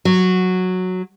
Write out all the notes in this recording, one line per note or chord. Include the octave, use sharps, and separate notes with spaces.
F#3